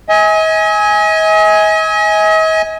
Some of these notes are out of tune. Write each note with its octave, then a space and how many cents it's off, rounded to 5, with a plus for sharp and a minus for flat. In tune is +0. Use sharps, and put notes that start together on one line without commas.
D#5 +45 G#5 +0